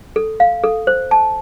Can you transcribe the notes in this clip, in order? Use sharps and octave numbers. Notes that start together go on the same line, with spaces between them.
A4
F5
A4
C5
A5